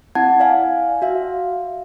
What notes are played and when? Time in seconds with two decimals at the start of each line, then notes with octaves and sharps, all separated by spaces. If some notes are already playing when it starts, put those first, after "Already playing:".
0.15 C4 E4 F#5 A5 G#6
0.40 D5 F5 G#5
1.02 F#4 E5 F5